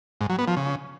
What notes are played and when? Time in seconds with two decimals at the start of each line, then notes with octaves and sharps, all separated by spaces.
0.21 G#2
0.30 F#3
0.39 B3
0.48 F3
0.57 C#3